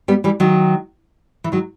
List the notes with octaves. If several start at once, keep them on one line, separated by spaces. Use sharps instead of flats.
G3 B3
E3 G3
D#3 F#3
E3
D#3 F#3